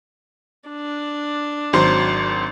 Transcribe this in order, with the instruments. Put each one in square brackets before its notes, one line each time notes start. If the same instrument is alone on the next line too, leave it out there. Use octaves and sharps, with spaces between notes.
[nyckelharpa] D4
[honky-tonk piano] G#1 F#3 C5